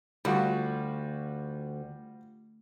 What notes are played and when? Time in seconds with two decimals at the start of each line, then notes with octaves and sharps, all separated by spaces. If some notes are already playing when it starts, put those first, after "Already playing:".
0.25 D2 G3 F4 F#4